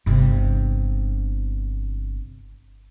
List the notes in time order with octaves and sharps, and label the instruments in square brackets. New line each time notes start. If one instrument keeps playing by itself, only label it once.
[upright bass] G1 C3